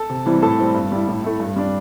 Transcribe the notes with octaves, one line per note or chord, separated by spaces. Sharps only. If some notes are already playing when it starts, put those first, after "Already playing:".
Already playing: A4 A5
C3
E3 G3 C4 E4
A2 A4 A5
G3 C4 E4
G2
G3 E4
A2
A3 E4
G2
G3 D4